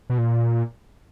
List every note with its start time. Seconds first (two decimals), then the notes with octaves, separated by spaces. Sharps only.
0.10 B2
0.18 A#2